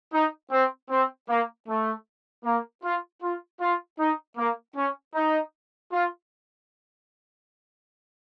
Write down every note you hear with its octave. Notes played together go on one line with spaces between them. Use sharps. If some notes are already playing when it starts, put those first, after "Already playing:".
D#4
C4
C4
A#3
A3
A#3
F4
F4
F4
D#4
A#3
C#4
D#4
F4